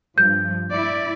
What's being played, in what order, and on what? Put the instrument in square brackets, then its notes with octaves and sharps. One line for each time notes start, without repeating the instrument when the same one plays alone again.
[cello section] G2 F3 [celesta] G6
[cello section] E4 D5